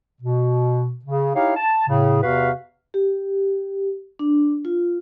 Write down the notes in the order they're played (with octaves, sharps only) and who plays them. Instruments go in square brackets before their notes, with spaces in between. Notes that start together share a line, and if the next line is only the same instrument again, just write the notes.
[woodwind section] B2
C#3
D#4 E4 G4 C#5 F5
A5
A2 C#3
E2 C3 F#4 B4 F5
[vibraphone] G4
D4
F4